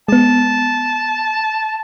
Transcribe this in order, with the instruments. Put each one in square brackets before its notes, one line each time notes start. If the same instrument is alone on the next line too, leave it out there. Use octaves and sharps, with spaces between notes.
[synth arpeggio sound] G#3 B3 [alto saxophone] A5